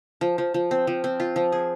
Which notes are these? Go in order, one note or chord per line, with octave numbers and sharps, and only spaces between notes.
F3
F3
F3
C4
F3
C4
F4
F3
G#4